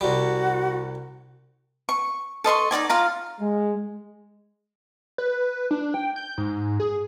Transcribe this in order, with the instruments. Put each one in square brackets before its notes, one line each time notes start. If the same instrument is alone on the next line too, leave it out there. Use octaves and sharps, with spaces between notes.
[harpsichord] C2 G3 [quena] F#4
[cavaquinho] C#6
A4 D#5 C6 C#6
D#4 F#4 D5 G#5
F4 F5 A#5
[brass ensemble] G#3
[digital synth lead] B4
D4
G5
G6
G#2
G#4